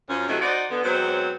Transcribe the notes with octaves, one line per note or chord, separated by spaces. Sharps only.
F#2 F3 C#4
C3 F#3 A3 D#4 E4
D#4 F#4 C5 D5
D3 B3
G#2 F#3 B3 C4 C5 C#5